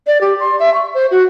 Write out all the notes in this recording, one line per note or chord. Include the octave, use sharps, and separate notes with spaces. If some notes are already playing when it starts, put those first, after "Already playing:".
D5
G4
C6
E5
C#6
C5
F#4